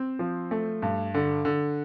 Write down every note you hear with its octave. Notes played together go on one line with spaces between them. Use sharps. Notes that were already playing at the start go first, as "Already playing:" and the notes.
Already playing: C4
F3
A3
G2
D3
D3